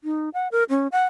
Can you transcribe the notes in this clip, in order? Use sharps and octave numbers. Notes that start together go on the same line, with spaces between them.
D#4
F#5
A#4
C#4
F#5